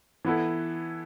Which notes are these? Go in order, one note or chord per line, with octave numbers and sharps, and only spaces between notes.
E3 B3 E4 A4